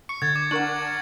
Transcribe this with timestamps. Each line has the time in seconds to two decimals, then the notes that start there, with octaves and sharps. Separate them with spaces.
0.09 C#6 C#7
0.22 D3 G#6 A6
0.35 D6 G#6
0.51 D4 A#4 F#5 C#6 F#7